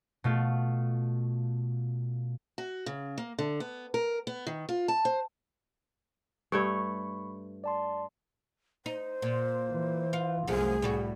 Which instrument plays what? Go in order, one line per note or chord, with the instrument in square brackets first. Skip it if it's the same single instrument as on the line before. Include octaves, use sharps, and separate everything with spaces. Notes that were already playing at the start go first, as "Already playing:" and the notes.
[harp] B2 A3 F4
[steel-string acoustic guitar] F#4
C#3
A#3
D3
B3
A#4
B3
D#3
F4
A5
C5
[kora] G2 A3 C#5 [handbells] B5 C#6
[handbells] D5 A5 C6
[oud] D#4 [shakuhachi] C5
[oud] A#2
[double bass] E3
[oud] F4
[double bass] C2 [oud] F#2 F3 A3 [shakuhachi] G#4
[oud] A2 G3 F#4